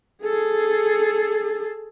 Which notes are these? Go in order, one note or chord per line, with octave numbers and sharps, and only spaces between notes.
G#4 A4